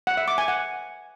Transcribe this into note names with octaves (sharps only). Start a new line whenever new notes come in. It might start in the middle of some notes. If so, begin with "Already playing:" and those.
F#5
E5
D6
G#5
F#5